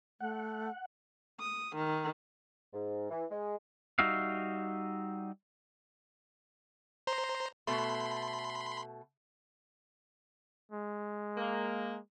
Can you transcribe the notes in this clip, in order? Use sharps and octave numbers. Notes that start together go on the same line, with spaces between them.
A3 F#5
D#6
D#3
G#2
E3
G#3
G3 D#4 F#4 E5 F5
C5 A#5 C6
B2 A3 B5 C6
G#3
A#3